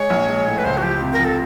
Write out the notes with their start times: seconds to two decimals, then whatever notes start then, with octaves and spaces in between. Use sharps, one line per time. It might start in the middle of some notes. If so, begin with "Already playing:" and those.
Already playing: G#3 C#5
0.10 A#1
0.28 G#3
0.47 A2
0.58 B4
0.65 C#2 C5
0.77 F#4
0.82 F3 G4
1.01 C3
1.13 A#4
1.19 F3
1.25 A4